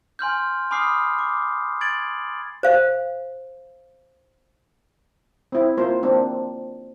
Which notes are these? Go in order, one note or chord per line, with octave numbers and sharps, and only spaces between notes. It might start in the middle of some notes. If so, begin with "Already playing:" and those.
G#5 C6 F6 G6
G#5 B5 D6 D#6 F6 C7
D6
G#6 A6 D7 F#7
C5 F5
C4 E4
A#3 F4 C5
A#3 C4 D4